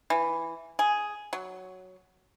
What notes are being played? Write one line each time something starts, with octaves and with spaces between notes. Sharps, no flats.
E3
G#4
F#3